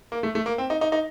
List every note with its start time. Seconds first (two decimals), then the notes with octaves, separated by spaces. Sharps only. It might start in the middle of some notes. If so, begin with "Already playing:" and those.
0.12 A#3
0.23 A3
0.35 A3
0.46 A#3
0.58 C4
0.70 D#4
0.81 D#4
0.92 D#4